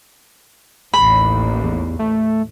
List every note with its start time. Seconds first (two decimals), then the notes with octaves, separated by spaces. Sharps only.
0.94 A1 D#2 B5
1.63 E2
1.99 A3